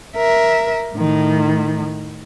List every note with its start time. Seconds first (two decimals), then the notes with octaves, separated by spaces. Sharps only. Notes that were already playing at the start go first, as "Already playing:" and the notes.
0.16 A#4 E5
0.95 A2 D#3